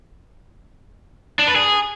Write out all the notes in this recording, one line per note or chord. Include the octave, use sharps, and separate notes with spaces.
D4
B4
G#4